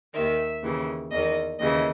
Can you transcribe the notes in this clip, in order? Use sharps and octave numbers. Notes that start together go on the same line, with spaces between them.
D#2 D#3 E5
D#2 C#3 E3
E2 D#3 D#5
D#2 C#3 E3 D#5